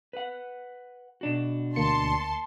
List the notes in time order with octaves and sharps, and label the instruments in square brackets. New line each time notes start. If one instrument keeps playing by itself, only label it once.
[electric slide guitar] B4 F#5
B2 D4 F#4
[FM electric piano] D2 A#3 C#7 [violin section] A5 C6